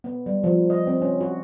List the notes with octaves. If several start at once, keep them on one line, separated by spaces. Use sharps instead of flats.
B3
G3
F3
D#5
C4
C#4
F#4